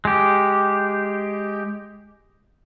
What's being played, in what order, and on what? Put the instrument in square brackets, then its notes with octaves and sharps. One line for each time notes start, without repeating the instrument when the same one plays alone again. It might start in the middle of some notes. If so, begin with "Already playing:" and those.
[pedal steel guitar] G#3 G4